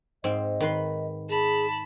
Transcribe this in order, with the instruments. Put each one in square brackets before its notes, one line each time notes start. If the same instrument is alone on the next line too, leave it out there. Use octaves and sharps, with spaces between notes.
[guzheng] G#2 C4 [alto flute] D#5
[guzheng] D#3 B4 C6
[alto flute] G#4 [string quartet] A5 B5